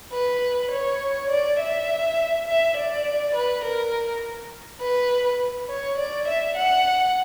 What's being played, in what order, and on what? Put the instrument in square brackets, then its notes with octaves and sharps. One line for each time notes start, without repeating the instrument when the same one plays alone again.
[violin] B4
C#5
D5
E5
E5
D5
B4
A#4
B4
C#5
D5
E5
F#5